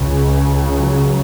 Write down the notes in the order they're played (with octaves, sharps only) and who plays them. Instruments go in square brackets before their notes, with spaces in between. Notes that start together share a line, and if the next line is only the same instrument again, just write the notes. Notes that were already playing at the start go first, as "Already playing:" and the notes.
Already playing: [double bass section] C#2 C#3
F#3